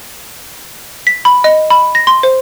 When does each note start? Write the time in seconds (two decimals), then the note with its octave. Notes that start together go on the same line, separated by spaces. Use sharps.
1.07 B6
1.25 B5
1.44 D#5
1.70 B5
1.95 A#6
2.07 C6
2.23 C5